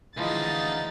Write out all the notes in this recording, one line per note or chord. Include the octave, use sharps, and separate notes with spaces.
D2 E3 F3 G#3 D#4 F5 A6